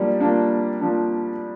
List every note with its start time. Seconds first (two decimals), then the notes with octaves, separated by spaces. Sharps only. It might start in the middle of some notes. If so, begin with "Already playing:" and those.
Already playing: F3 G3 A#3 D4
0.20 F3 A#3 D4
0.81 F3 A#3 D4